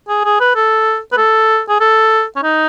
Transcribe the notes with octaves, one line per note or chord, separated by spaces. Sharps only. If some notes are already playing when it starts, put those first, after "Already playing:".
G#4
G#4
B4
A4
B4
A4
G#4
A4
C#4
D#4